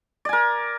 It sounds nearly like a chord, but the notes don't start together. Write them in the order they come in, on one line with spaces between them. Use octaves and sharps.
D5 G#5 A#4